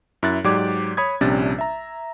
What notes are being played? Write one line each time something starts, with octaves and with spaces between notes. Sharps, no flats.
F#2 E4 F#6 A6
G#2 F#3 G4 D5 D6 G#6
C#5 B5 D#6 G#6
A#1 C3 G3 C#4 D4 A6
E5 A#5